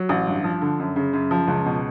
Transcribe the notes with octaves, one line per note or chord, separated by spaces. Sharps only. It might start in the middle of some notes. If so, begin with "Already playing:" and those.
Already playing: F#3
A1
G2
F3
D3
F#2
C#3
F#2
F3
C#2
B2